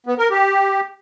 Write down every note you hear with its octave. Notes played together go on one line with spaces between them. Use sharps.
B3
A#4
G4